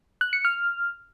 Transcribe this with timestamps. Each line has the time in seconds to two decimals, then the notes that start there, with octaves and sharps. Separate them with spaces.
0.21 F#6
0.33 C#7
0.45 F6